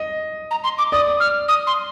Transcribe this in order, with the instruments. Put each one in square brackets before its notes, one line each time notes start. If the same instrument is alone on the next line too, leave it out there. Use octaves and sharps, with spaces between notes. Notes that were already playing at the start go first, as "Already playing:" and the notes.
Already playing: [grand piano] D#5
[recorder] A#5
C6
D6
[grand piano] D5 [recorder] D#6
[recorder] F6
D#6
C6